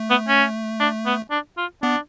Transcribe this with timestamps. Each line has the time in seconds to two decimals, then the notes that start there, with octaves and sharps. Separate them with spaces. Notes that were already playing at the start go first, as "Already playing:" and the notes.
Already playing: A3
0.11 B3
0.28 C#4
0.80 D4
1.06 B3
1.31 D4
1.58 F4
1.82 B3 D4